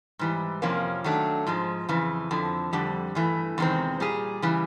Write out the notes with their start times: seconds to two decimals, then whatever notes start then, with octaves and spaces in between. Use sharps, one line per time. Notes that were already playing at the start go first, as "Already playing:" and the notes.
0.19 G#2 E3 G3
0.62 F2 C3 F3 A#3 C#4
1.04 D#3 F#3 A3 D4
1.47 G#2 F3 G#3
1.89 F2 C#3 E3
2.31 F2 D3 F3
2.73 F2 D3 G3
3.15 G2 E3 A3
3.58 E2 C3 D#3 G#3 C4
4.00 A#2 G3 G#4
4.42 C#3 E3 G3